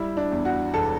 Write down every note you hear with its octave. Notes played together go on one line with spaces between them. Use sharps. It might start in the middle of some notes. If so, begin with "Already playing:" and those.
Already playing: G3 E4
D4
E2
F#4
E1 A4